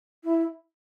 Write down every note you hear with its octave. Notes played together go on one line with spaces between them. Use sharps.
E4